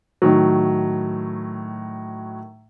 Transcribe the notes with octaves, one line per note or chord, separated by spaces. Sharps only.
A2 D#3 F#3